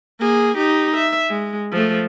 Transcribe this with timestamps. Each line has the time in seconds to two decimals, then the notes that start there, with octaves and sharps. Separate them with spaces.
0.20 A#3 G#4
0.57 D#4 G4
0.96 E5
1.30 G#3
1.72 F3 A3